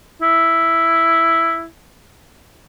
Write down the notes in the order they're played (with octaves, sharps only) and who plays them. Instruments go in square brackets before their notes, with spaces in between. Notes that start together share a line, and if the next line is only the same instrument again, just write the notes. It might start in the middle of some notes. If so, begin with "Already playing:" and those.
[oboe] E4